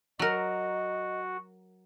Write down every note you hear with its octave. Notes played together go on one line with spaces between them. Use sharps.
F#3 F#4 A#4 D#5